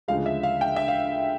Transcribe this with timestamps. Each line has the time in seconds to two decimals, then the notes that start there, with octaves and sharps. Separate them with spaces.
0.08 D2 C#3 F3 G#3 F5
0.26 E5
0.43 F5
0.61 G5
0.76 E5
0.88 F5